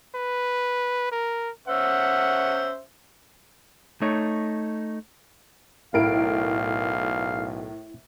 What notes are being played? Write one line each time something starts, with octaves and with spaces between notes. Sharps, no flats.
B4
A#4
C#4 C5 E5 F#5
A3 D#4 C#5
B1 A2 E4 A#4 F5 D7